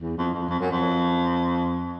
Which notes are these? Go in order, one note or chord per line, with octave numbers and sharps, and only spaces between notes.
E2
F2
F2
F2
F#2
F2